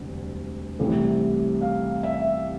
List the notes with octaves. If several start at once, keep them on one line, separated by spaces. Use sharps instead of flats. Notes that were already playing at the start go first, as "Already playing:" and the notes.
Already playing: E1 D2 C3 G3 D4
C2 C3 E3 A3
F5
E5